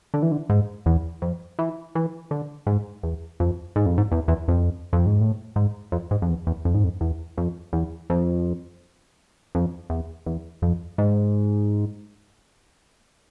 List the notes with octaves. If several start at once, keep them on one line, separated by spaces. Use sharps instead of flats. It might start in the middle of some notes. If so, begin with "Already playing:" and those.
D3
E3
D3
G#2
E2
F2
E3
E3
D3
G#2
E2
F2
G#2
F2
G#2
E2
E2
F2
F2
G#2
A2
G#2
F2
G#2
F2
E2
E2
F2
G#2
F2
E2
F2
E2
F2
F2
E2
E2
F2
G#2